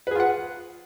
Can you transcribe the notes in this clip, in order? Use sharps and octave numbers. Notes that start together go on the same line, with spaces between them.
F4 G#4 B4 F#5